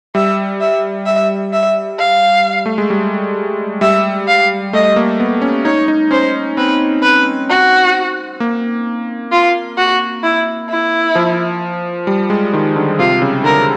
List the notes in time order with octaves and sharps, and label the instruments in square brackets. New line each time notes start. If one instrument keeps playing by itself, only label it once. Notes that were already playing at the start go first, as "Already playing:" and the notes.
[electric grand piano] G3 [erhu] E5
[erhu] E5
E5
E5
F5
[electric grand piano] A3
G#3
G3
[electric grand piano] G3 [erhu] E5
[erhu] F5
[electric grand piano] A3 [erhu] D#5
[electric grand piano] A#3
B3
C#4
[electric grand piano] D#4 [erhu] C#5
[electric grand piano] D#4
[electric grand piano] C#4 [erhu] C5
[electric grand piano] C4 [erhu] B4
[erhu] B4
F#4
[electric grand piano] A#3
[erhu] F4
F#4
E4
E4
[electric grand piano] F3
G3
G#3
D#3
D3
[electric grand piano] C3 [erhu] F4
[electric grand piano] C#3
[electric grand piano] D3 [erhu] A#4